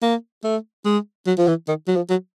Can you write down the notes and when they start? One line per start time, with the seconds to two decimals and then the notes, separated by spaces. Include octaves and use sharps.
0.02 A#3
0.44 A3
0.85 G#3
1.27 F#3
1.38 F3
1.48 E3
1.68 D#3
1.88 F#3
1.96 F3
2.10 F#3